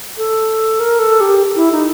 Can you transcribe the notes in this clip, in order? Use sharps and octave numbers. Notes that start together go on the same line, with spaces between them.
A4
A#4
A4
G4
E4
D#4